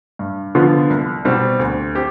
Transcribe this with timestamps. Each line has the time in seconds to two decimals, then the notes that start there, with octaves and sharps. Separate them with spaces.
0.19 G2
0.55 D3 F3 B3 F4
0.90 C2
1.25 B2 G3 C4
1.59 D2
1.95 C4 G4